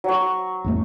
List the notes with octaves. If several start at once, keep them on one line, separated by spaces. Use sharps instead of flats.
F#3 C#6
A1 F2 A3